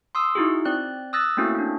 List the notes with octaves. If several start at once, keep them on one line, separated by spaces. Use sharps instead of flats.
C6 D#6 E6
D#4 E4 F#4 G#4
C4 D5 F#6
D#6 E6 F#6 A6 A#6
A3 A#3 C4 C#4 E4 F#4
C#4 D4